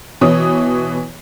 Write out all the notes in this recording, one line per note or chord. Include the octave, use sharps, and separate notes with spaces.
B2 E3 C#5 D#6